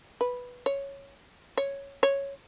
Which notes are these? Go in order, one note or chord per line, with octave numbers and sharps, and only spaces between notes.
B4
C#5
C#5
C#5